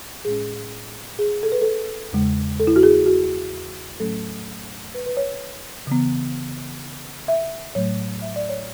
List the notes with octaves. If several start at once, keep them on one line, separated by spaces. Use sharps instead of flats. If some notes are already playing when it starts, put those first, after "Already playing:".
A2 G#3 C#4 G#4
G#4
A4
B4
A4
E2 C#3 G#3
A4
E4
F#4
G#4
F#4
A2 F#3 A3 C#4 A4
B4
B4
C#5
C#3 E3 B3
E5
A2 F#3 A3 C#5
E5
D5
C#5